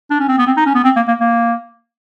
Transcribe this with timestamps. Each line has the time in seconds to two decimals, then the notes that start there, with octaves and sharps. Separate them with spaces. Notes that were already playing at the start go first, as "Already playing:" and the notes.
0.11 D4
0.20 C#4
0.28 C4
0.38 B3
0.47 C4
0.57 D#4
0.66 C#4
0.75 B3
0.84 C4
0.96 A#3
1.08 A#3
1.20 A#3